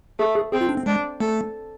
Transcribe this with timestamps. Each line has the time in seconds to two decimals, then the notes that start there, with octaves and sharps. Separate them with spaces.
0.19 A3 G#4
0.35 G#4
0.52 C4 G#4
0.61 F4
0.69 D4
0.77 C4
0.86 G#3 D4
1.20 A3 A4